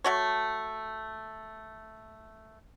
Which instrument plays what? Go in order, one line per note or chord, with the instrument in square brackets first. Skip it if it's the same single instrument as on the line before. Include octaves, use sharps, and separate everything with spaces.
[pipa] A3 F#4 C#5